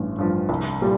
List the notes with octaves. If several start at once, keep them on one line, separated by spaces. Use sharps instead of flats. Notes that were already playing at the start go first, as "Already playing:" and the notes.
Already playing: A1 G2 F3
G2 F3
C2
A#2 G3